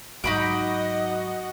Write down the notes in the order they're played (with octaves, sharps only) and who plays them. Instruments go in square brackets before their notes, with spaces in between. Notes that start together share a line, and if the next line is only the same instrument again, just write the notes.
[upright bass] G#2 F#3 [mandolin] D#4 B5 D6 [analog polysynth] F#4 [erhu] D#5